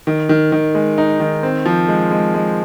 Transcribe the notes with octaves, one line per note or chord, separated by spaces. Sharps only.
D#3
D#3
D#3
G#3
D#4
D#3
C4
F3
G#3
G#3
G#3